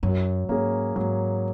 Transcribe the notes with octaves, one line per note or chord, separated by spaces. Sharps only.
F#2 F#3
G#2 A#3 C#4 G#4
G#2 F#3